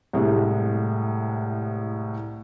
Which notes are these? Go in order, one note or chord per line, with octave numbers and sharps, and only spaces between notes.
C2 A2 C3 G#3